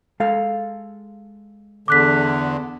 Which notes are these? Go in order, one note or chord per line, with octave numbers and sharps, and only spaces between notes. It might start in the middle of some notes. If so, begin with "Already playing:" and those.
G#3 A4 F5
E2 D3 D6 F#6 B6